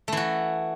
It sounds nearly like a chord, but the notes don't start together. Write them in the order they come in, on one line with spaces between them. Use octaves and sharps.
A3 E3 F#4